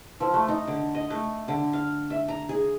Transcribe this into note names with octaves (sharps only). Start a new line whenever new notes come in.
F3
A3
D#4
D3
D#5
A3
D3
F5
E5
A#5
G#4